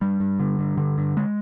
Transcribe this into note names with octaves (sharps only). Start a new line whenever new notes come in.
G2 G3
G2
D3
G2
D3
G2
G#3